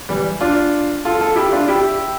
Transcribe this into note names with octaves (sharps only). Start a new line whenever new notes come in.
E3 G3
D4 F4
F4 A4
F4 A4
E4 G4
D4 F4
E4 G4